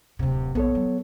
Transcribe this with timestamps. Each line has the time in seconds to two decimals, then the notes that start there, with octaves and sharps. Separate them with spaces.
0.19 D1 C3
0.55 A#1 B3 A4 C#5
0.75 F#3